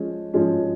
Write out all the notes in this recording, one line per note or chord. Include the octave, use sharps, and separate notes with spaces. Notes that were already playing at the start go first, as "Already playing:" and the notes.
Already playing: F3 G#3 C#4
F3 G#3 C#4